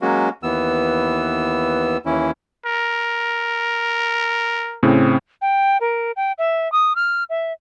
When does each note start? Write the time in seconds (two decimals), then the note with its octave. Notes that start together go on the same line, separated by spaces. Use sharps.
0.02 F#3 G#3 A#3 C#4 F#4
0.43 D#2 E3 B3 E6
2.06 D#2 E3 C#4 E4
2.66 A#4
4.83 A2 C#3 C4
5.41 G5
5.81 A#4
6.16 G5
6.38 E5
6.72 D#6
6.96 F6
7.29 E5